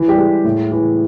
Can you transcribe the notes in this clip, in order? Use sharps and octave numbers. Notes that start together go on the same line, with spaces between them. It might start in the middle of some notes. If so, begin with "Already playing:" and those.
Already playing: E3
G3 G4
G#3
A2
E3